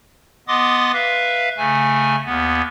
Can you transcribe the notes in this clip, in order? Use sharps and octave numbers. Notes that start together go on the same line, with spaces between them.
B3 D#5 C6 D6 D#6 A6
B4 E5 F5
C#3 A3 G#5
D#2 B3